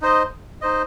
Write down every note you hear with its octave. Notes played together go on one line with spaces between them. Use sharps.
D#4 C5 D#5
D#4 C5 D#5